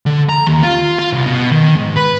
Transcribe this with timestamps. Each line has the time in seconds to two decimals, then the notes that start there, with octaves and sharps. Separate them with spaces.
0.06 D3
0.29 A#5
0.47 D#2
0.63 F4
0.99 F4
1.13 C2
1.26 B2
1.52 D#3
1.76 G#2
1.97 B4